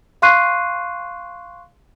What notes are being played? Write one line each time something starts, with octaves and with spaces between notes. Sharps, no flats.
F5 C6 C#6 F#6 C7 D#7